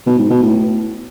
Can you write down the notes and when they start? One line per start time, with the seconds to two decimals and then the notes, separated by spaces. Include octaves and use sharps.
0.06 B2
0.18 G#2
0.30 B2
0.42 A2